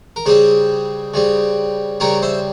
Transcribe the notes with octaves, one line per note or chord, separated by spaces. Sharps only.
A#4
C#3 G3 C4 G#4 C5
C#3 G3 C4
C#3 G3 C4 A#4 C#5
C5 E5